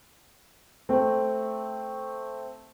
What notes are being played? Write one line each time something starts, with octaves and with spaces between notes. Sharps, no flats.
A3 C4